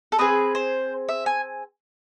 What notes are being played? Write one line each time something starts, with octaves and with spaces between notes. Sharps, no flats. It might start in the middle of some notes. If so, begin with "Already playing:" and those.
A4
C4 G#4 B4
C5
E5
G#5